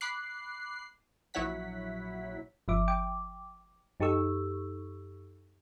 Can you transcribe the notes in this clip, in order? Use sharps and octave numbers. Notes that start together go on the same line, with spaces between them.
B5 D6 F#6 C7
A#1 F#3 E4 C#5 F#5 B6
G1 F3 E5 D6
G5 D6
F#2 D#4 G4 A4 C#6 E6